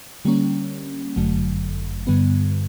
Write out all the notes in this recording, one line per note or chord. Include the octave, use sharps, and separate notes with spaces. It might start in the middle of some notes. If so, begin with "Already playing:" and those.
D3 G3 A#3 C#4
G1 F#2 D3 F#3 A3
G2 D3 G3 B3